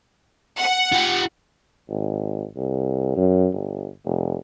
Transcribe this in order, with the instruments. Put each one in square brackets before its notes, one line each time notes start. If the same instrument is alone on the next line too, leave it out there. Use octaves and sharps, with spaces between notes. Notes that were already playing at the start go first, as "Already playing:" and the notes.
[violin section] F#5
[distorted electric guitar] F4 G4
[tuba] G#1
C2
F#2
G1
F1